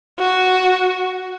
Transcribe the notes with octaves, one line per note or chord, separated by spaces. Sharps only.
F#4